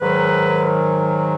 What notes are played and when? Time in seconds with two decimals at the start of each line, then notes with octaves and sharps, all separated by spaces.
0.01 G#2 D#3 F#3 B4